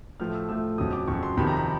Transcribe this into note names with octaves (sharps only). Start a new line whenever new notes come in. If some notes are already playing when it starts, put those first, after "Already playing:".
A2 F3 A3 F6
E6
A2 F3 A3 E6
F2 C#3 F#3 D#6
D6
F2 C#3 F#3 C#6
C6
F2 C3 D#3 B5
A#5
B5